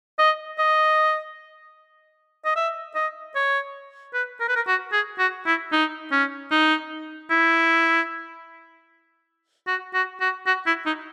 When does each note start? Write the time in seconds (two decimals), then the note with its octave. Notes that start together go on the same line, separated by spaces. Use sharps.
0.19 D#5
0.58 D#5
2.45 D#5
2.56 E5
2.95 D#5
3.35 C#5
4.14 B4
4.40 A#4
4.48 B4
4.56 A#4
4.67 F#4
4.93 G#4
5.19 F#4
5.46 E4
5.72 D#4
6.12 C#4
6.51 D#4
7.30 E4
9.67 F#4
9.94 F#4
10.21 F#4
10.47 F#4
10.66 E4
10.86 D#4